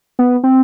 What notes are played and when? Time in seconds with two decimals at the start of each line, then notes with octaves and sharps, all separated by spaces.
0.19 B3
0.44 C4